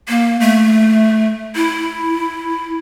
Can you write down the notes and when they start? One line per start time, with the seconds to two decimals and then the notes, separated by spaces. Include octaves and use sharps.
0.09 A#3
0.40 A3
1.56 E4